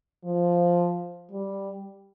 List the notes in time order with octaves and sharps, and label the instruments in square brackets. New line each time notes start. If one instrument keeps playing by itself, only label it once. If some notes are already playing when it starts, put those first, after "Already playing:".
[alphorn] F3
G3